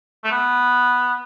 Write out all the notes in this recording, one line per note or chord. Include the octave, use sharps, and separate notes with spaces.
A3
B3